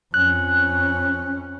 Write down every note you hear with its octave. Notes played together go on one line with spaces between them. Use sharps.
F2 C#4 F#6